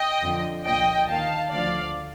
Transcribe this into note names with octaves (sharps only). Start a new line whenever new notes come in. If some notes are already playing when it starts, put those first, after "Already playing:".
Already playing: D#5 G5
F2 D3 F3
C2 A#2 F3 D#5 G5
D#2 D#3 F5 A5
D2 D3 F3 D5 F5